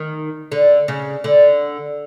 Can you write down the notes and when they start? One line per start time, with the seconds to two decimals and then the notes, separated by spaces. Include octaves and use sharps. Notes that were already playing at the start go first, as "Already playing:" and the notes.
Already playing: D#3
0.52 D3
0.88 C#3
1.24 D3